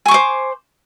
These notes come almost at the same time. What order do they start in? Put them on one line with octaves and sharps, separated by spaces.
G#5 C#6 D6 C5